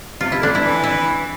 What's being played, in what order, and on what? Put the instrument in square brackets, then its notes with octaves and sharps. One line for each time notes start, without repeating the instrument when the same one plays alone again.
[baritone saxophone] C3 [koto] F4
[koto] E4
[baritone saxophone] D3 [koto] D4
[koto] E4
[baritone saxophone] E3
[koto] E4